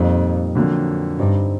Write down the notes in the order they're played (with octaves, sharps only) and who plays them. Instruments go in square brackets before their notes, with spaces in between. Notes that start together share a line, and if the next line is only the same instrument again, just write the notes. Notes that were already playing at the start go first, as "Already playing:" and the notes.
Already playing: [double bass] F2 [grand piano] A#2 G3 C4 D#4
[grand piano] F2 D3 F#3 A#3
[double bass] G2 [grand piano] D3 G3 C4 D#4